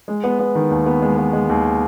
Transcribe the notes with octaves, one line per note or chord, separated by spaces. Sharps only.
G#3
B3
B3
D#3
D#2
B3
G#3
B3
G#3
D#2